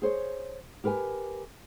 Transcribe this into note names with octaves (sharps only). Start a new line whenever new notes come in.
G#4 C5 C#5
G4 A#4 B4 F#5 G#5